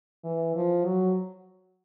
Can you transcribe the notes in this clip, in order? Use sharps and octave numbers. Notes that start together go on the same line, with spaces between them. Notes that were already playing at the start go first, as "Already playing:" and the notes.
E3
F3
F#3